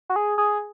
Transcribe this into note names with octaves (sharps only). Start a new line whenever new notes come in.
F#4
G#4
G#4